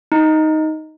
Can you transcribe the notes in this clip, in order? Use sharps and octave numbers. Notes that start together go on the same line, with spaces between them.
D#4